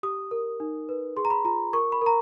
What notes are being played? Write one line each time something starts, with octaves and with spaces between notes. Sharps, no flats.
G4 D#6
A#4
D#4
B4
G#4 C6
A#5
B5
F4 A#5
A#4 C#6
B5
A#4 A#5